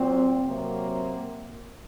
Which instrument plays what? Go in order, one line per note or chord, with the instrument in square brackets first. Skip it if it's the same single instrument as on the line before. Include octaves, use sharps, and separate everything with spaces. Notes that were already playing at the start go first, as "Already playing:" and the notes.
Already playing: [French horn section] A#2 F#3 C4
C3 F#3 A#3